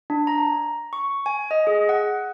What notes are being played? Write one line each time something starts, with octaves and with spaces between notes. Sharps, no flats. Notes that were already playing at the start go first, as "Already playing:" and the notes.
D4
A#5
C#6
G#5
D#5
G#4
F#5